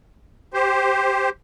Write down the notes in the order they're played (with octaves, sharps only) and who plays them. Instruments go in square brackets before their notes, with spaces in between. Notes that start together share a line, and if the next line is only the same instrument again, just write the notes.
[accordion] G4 C5